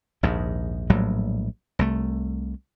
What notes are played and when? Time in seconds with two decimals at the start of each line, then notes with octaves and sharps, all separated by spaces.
0.23 A#1 D#2 G#2
0.90 A#1 A2 F#3 G3
1.79 C2 A3